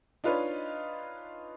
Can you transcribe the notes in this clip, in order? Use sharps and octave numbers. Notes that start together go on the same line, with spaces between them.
D4 D#4 F4 B4 C#5